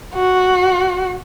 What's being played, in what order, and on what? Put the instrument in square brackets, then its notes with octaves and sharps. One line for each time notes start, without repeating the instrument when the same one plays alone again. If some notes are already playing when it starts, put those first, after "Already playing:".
[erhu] F#4